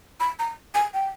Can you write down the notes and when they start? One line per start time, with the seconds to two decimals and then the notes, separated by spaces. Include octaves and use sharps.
0.20 B5
0.39 A#5
0.75 G#5
0.94 G5